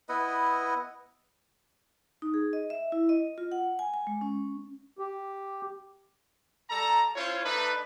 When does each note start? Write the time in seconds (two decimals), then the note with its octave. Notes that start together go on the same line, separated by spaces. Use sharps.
0.09 B3 E4 B4 D#5
2.22 D#4
2.34 G#4
2.53 D#5
2.70 E5
2.92 E4
3.09 D#5
3.38 F4
3.52 F#5
3.79 G#5
3.94 G#5
4.07 G#3
4.21 C#4
4.99 G4
6.70 G3 A4 A#5
7.16 C#4 E4 F4 C5 C#5
7.45 A3 D4 D#4 B4